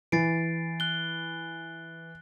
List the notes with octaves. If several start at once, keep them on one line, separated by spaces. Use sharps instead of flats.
E3 A6 C7 D7
F#6 G7